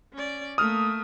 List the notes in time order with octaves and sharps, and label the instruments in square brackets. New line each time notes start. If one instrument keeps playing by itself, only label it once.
[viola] C#4 D5
[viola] A3 A#3 [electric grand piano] D#6 F6